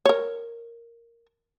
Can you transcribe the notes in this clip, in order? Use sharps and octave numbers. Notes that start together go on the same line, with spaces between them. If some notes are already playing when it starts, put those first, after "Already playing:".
A#4 C#5